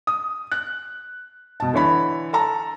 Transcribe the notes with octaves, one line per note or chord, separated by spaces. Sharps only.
D#6
F#6
B2 A5
D3 E3 C#5 B5
A4 A5 A#5